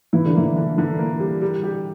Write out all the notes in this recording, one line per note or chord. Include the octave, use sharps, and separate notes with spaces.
E3 E4
D3
E3 A#3
D3
D3 E3
A#3
G3
G3
G4